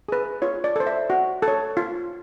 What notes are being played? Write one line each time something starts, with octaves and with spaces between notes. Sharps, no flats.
G#4 B4
F4 C#5
D5
A4 C5
E5
F#4
A4
C#5
F4